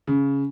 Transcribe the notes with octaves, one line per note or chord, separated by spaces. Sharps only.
C#3